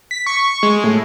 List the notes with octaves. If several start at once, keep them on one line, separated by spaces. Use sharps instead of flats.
B6
C#6
G#3
A2